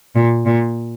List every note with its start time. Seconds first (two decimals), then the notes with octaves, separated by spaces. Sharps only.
0.15 A#2
0.46 A#2